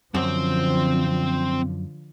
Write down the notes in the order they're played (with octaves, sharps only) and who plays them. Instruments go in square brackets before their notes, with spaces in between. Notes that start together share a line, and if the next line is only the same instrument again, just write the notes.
[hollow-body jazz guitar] F#2 [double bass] D3 F3 [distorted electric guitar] C4 C5